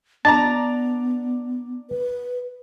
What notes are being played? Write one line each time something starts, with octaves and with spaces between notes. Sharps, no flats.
B3 D4 D5 A5 A#5
B4